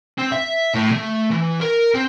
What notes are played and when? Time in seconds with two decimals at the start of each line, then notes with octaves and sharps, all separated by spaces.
0.18 C4
0.33 E5
0.75 A2
0.92 A3
1.31 E3
1.61 A#4
1.94 C4